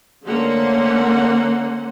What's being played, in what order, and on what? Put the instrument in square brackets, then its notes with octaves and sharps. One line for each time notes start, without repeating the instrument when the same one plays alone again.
[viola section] D3 A3 A#3 C#4 C5 F#5